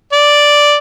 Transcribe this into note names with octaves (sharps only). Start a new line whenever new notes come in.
D5